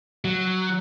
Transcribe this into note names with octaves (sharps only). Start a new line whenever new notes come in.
F#3